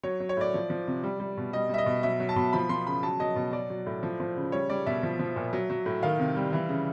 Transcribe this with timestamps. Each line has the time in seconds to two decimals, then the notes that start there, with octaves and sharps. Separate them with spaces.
0.03 F#3 C#5
0.20 F#3
0.29 C#5
0.37 A2 D5
0.54 F3
0.70 F3
0.88 C3
1.03 G3
1.20 G3
1.37 B2
1.53 G3 D#5
1.70 G3 E5
1.78 D#5
1.86 B2
2.03 F#3 E5
2.20 F#3
2.29 A5
2.36 B2
2.53 F3 B5
2.69 F3 C6
2.87 C#3 B5
3.03 F#3 A5
3.20 F#3 D#5
3.36 B2
3.53 F#3 D5
3.70 F#3
3.86 A2
4.03 F3
4.20 F3
4.37 C#3
4.52 G3 C#5
4.70 G3 D5
4.86 B2 E5
5.03 F3
5.19 F3
5.36 A#2
5.53 F#3
5.70 F#3
5.86 A2
6.02 D#3 F5
6.19 C3
6.36 G3
6.53 E3
6.69 C#3